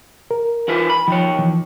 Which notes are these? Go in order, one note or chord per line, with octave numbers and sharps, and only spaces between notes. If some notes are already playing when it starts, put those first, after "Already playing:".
A#4
E3 F4 B4
B5
D#3 F3 C#5
E3 F3